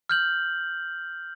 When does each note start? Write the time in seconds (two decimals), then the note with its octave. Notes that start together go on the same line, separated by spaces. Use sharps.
0.09 F6 G6 F#7